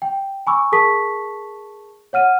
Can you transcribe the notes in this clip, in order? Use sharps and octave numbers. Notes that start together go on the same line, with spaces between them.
G5
G#5 B5 C#6 D6 E6
G#4 A#4 A5 C#6 D#6 B6
C#5 F#5 F6 D#7